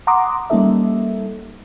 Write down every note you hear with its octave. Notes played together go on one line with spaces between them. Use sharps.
F#5 A#5 C6 D6 D#6
G3 A#3 C#4 D#4 A4 E5